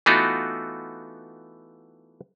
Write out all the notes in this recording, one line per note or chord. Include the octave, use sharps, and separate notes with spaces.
E3 A3 B3 D#4 F4 F#4